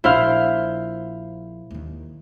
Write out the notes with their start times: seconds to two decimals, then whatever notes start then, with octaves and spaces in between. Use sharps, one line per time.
0.04 A#1 E4 C5 F5
1.71 D#2 D#3